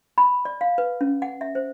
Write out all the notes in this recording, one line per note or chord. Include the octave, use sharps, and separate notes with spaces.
B5
D5
F5
B4
C#4
F#5
E5
C5